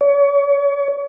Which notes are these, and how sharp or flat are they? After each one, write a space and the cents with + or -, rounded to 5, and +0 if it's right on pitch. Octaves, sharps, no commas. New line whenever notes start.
C#5 +35